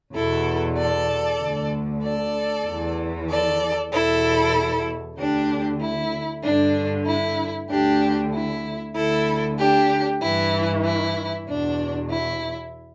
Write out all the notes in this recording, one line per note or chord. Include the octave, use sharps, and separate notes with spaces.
E2 B2 E4 A4
A4 D5
D2 D3
A4 D5
E2 E3
A4 D5
E2 B2 E4 A4
D2 D3 D4 G4
E4
G2 D3 D4
E4
D2 D3 D4 G4
E4
D2 D3 E4 A4
D4 G4
G2 E3 E4
E4
E2 B2 D4
E4